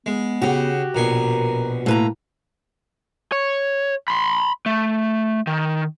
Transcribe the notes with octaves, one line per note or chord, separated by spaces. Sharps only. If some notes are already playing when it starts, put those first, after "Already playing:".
G#3 B3
C#3 F#4 G4
A#1 B2 A#4 G#5
A2 A#3 B4 A#5
C#5
B5 C6
A3
D#3